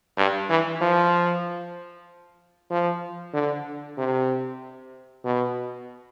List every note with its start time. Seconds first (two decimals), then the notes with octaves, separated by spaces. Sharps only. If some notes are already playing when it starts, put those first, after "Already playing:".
0.17 G2
0.49 E3
0.81 F3
2.71 F3
3.34 D3
3.98 C3
5.24 B2